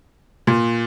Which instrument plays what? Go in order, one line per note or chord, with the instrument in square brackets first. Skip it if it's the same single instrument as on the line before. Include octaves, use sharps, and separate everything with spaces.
[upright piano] A#2